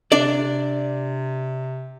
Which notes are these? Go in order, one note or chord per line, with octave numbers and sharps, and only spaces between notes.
C3 D4 D5